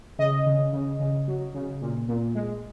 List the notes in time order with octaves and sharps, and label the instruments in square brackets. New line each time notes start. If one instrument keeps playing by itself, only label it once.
[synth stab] C#3 D#5
C#3
C#3
C#3
F#3
C#3
A#2
A#2
G#3